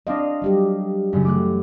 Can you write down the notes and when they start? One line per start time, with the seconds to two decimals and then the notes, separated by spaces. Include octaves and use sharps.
0.07 C4 D4 D#5 F5
0.42 F#3 G3 G4
1.13 F#2 C#3
1.25 E3 A3 G4 D6 F#6